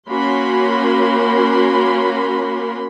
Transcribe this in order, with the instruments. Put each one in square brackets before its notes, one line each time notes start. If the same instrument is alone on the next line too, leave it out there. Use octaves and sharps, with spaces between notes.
[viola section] A#3 C#4 F#4 B5 C6